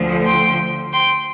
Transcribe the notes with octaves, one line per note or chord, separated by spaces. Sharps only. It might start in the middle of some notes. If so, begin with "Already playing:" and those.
Already playing: D2 D3 F3
G5 C6
G5 C6